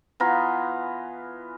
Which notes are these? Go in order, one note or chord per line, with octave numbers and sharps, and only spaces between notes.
E3 B3 F4 A#5